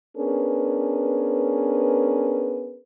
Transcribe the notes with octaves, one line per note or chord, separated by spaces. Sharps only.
B3 C#4 D4 G#4 A#4 B4